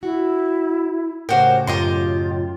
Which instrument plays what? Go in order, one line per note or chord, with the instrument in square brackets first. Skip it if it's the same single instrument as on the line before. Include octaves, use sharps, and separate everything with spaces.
[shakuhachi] E4 [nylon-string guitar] F#4
[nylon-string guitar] A2 C#3 [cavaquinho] F#4 G4 [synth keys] A#4 C5
[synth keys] F#2 F#3 [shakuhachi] F4 [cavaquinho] G4 D#5 C6